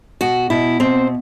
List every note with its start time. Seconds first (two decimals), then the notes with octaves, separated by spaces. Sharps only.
0.21 B2 F#4
0.50 B2 E4
0.80 B2 C4